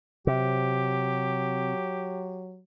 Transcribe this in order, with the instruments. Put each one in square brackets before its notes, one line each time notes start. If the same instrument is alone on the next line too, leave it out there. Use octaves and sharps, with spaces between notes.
[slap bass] C3 [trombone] F#3 [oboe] G4